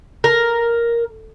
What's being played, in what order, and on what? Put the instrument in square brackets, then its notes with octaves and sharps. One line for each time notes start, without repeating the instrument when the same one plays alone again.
[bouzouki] A#4